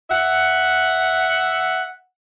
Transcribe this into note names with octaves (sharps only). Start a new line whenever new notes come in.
E5 F#5